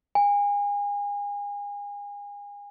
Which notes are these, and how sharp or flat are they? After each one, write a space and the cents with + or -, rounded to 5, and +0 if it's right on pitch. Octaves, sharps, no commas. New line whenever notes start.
G#5 -35